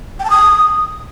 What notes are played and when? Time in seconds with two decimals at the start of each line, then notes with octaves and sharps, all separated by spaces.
0.20 G5
0.25 A5
0.30 D#6